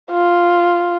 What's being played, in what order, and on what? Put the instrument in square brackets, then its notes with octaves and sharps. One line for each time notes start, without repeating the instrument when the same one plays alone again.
[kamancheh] F4